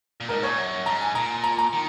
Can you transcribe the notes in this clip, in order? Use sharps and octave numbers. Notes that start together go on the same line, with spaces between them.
A#2
G#2 A#4
A#2 C#5
F#2
G#2 A#5
G#5
A#2 A#5
A#5
A#5
D#3